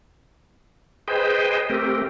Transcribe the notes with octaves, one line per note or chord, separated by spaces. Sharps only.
G#4 B4 C5 D#5 G5
A3 C4 G4 A#4